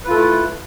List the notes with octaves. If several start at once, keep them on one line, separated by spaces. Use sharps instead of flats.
A3 E4 F4 A4 B4